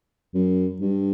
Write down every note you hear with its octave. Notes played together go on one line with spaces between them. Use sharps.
F#2
G2